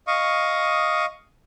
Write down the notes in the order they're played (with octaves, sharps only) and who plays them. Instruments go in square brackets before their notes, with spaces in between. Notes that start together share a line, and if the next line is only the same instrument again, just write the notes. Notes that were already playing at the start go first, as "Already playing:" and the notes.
[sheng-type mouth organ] D#5 F5 C#6 D#6